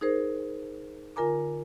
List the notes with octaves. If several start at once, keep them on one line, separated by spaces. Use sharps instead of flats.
D#4 G#4 A#4 C5
D3 F4 A#4 G#5 A#5 D6